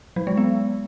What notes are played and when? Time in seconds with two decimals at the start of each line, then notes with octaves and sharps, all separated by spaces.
0.16 F#3
0.27 G#3
0.37 B3